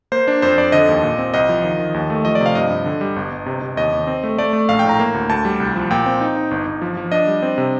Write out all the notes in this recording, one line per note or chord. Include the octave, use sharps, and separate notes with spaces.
A#3 C5
D4
F2 C5
F2 D5
D3 D#5
D#2
A#2
C4
C2 D#5
F3
D#3
D#3
D#2
A3
F3 D#5
D5
C3
F5
G2 D#5
G2
D3
G3
G1
G1
C3
C3
D#2 D#5
D#2
C4
A3
A3 D5
A3
A#1 F5
G5
A2 A#5
A#3
D2
D2 A5
G3
C2
F3
A#2 G5
C4
D#4
D#4
G1
G1
F3
F3
D4 D#5
G3
C4
C3